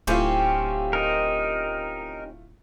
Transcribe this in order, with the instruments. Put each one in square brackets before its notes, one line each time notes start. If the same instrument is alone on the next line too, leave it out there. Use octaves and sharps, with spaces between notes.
[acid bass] D1 [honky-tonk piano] A3 E4 F4 [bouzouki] C4 C#4 G4
[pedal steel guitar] D#4 A#4